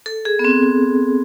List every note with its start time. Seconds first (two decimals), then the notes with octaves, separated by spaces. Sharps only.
0.06 A4
0.25 G#4
0.39 B3
0.45 C4